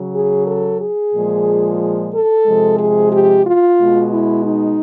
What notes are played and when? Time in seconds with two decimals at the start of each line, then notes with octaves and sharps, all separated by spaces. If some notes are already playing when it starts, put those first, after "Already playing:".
Already playing: C#3 F#3
0.15 G#4
0.47 A4
0.81 G#4
1.14 A#2 F3 G#3
2.14 A4
2.46 C3 F3 G#3
2.79 G#4
3.13 G4
3.46 F4
3.80 B2 G#3
4.13 E4
4.45 D#4